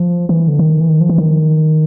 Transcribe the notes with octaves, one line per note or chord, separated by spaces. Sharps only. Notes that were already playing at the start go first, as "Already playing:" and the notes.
Already playing: F3
E3
D3
D#3
E3
D#3
F3
E3
D#3